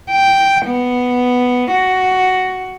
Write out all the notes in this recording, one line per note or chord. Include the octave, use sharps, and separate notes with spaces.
G5
B3
F#4